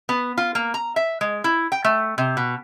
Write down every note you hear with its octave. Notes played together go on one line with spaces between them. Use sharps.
B3
F4
A#3
A#5
E5
G#3
E4
G5
A3
C3
B2